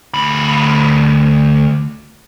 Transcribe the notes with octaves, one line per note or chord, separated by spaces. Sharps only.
D2 B5